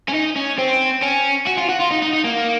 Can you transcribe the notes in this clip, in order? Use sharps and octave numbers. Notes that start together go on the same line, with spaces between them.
C#4
D#4
C#4
C4
C#4
F#4
F4
F#4
F4
D#4
D#4
D#4
A#3